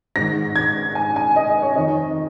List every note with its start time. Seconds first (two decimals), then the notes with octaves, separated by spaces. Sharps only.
0.16 G#2 D#3 A#6
0.56 G#6
0.95 G#5
1.16 G#5
1.36 D#5
1.49 D#5
1.62 C#5
1.75 F2 D#3 D#5